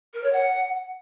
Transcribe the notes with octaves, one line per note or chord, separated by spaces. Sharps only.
A#4
C#5
F#5